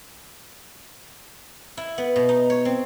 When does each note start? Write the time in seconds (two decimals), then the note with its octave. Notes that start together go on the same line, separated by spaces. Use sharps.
1.77 E4
1.98 B3
2.16 B2
2.29 D#4
2.50 C#5
2.65 C4